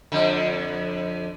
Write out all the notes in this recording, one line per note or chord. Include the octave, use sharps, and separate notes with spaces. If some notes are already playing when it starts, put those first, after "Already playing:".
F2 D3